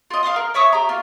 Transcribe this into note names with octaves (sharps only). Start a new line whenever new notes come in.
F4 D#5
F4 F5 C6 D#6
A#4
C#5 E5 C#6 D#6
G4 A#5
A#3 F4